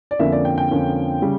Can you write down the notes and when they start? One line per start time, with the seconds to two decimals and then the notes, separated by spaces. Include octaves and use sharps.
0.11 D5
0.19 F2 D3 F3 A#3 C#4 E5
0.32 D5
0.45 G5
0.58 G5
0.71 F2 D3 F3 A#3 C#4
1.22 C#3 G3